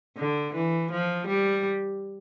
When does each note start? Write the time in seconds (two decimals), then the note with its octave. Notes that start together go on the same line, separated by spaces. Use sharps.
0.17 D3
0.54 E3
0.91 F3
1.27 G3